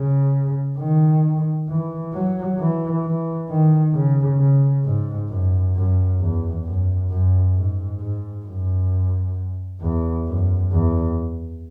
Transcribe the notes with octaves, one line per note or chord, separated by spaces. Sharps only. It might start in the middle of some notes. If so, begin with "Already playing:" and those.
Already playing: C#3
D#3
E3
F#3
E3
E3
D#3
C#3
C#3
G#2
F#2
F#2
E2
F#2
F#2
G#2
G#2
F#2
E2
F#2
E2